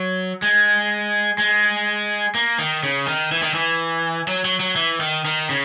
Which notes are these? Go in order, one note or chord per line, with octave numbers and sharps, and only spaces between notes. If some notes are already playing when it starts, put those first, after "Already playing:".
Already playing: F#3
G#3
G#3
A#3
D#3
C#3
D#3
E3
D#3
E3
F#3
F#3
F#3
E3
D#3
D#3
C#3